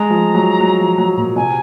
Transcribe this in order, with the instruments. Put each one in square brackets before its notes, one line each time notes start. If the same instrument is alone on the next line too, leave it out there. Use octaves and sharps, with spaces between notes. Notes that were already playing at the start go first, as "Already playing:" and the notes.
Already playing: [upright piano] G#3 [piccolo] A#5
[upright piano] F3
F#3
F#3
F3
F#3
A#2
[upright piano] C3 [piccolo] G#5